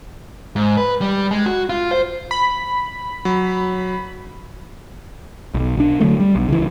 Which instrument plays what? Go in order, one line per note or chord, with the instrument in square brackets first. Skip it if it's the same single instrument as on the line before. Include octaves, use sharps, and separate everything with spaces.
[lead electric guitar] G#2
B4
G3
G#3
F#4
F4
C5
[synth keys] B5
[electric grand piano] F#3
[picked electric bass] B1
B1 D4
D3 F#3 A3
G3
B1
C#2 E3